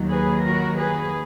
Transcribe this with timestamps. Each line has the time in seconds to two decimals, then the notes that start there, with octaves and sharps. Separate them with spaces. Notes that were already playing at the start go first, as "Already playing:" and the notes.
Already playing: D#2 D#3 F#3
0.11 G#4 B4
0.45 F#4 A#4
0.79 G#4 B4